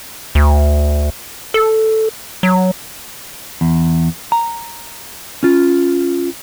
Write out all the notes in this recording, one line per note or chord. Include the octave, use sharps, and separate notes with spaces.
D2
A4
F#3
E2
A#5
C#4 F4